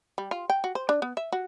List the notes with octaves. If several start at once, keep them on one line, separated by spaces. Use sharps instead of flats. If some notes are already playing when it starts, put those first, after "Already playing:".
G3
F4
G5
F#4
C5
D4
B3
E5
F#4